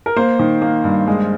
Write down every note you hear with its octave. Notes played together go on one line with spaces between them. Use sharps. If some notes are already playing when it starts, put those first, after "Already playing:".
A#4
A#3 C5
D#3
A#3
G2
G#3